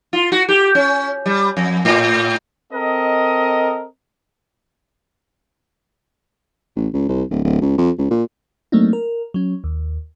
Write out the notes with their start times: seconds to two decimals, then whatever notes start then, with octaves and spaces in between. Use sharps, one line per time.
0.13 F4
0.32 F#4
0.49 G4
0.75 C#4
1.26 G3
1.57 F2
1.85 A2
2.73 C4 A4 A#4 D#5
6.76 A1
6.94 C#2
7.09 C2
7.30 D1
7.44 D1
7.62 C#2
7.78 F2
7.98 C#2
8.11 A#2
8.72 F#3 A3 A#3 C4 D4 D#4
8.93 A#4
9.34 F#3 C#4
9.64 D#2